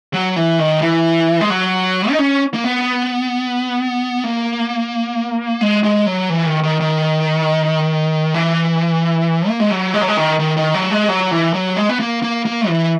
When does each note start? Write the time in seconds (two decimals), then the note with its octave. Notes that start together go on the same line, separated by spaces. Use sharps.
0.14 F#3
0.36 E3
0.59 D#3
0.82 E3
1.41 G#3
1.50 F#3
2.11 D#4
2.19 C#4
2.54 A#3
2.64 B3
4.24 A#3
5.61 G#3
5.83 G#3
6.06 F#3
6.29 E3
6.46 D#3
6.63 D#3
6.80 D#3
8.34 E3
9.48 A#3
9.60 G#3
9.71 F#3
9.94 G#3
10.01 F#3
10.08 G#3
10.17 D#3
10.40 D#3
10.57 D#3
10.74 F#3
10.91 G#3
11.08 F#3
11.31 E3
11.53 F#3
11.76 G#3
11.89 B3
12.00 A#3
12.22 A#3
12.45 A#3
12.68 E3